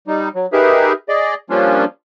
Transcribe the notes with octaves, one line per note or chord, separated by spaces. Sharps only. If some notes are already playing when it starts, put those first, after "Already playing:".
G3 D#4
F#3
D#4 G4 G#4 A#4 B4 E5
G#4 D5 D#5
F3 G3 A#3 C#4 D4 F4